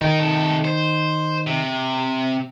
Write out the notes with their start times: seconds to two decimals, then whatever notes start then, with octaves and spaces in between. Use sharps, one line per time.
0.02 D#3 D#4 A#4
0.20 C3 A4
0.65 C5
1.47 C3